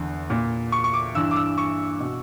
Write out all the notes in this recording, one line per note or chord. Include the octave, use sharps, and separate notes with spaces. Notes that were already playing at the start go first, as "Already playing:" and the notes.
Already playing: E2 D3
A#2
C#6
C#6
D6
G2 E3 E6
D6
E6
C#6
B2